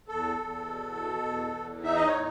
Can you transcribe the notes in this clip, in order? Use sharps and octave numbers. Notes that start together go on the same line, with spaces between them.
E2 A4
E2
B2
B2
E2
E2
D#4 E5
D#5
C#5
A2